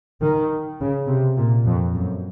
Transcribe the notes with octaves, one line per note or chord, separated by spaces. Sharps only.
D#3
C#3
C3
A#2
F2
F#2